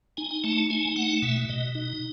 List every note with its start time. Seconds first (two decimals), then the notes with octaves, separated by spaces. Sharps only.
0.17 D#4 G#5
0.31 G#5
0.44 A3 A5
0.57 A5
0.70 D#4 G#5
0.96 A3 F#5
1.22 B2 E5
1.49 B2 D#5
1.75 D#4